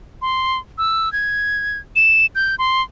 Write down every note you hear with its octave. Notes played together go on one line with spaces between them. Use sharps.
C6
E6
G#6
E7
G6
C6